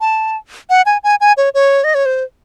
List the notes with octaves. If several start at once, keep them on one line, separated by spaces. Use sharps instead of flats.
A5
F#5
G#5
G#5
G#5
C#5
C#5
D#5
C#5
C5